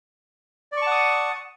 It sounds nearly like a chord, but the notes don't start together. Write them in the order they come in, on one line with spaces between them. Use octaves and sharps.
D5 C#6 A5 F#5 D#6